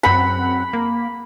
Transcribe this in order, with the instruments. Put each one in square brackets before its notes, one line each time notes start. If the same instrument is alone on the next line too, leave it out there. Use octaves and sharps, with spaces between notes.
[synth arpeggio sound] F#2 C4 F#5 [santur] B5
[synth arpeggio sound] A#3